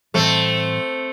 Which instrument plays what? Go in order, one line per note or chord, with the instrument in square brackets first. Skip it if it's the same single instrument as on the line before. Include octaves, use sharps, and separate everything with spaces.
[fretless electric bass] A2 E3 G3 [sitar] A3 C4